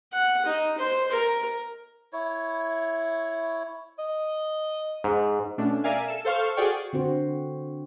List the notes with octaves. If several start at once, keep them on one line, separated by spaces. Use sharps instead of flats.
F#5
D#4
C5
A#4
E4 C#5
D#5
G#2
B2 A3 C#4 D4
A#4 D5 E5 F5 G#5
A4 E7
A4 C5 F5 C#6 F6
F#4 G#4 D5 G5 C#6
D3 C4 F#4 C5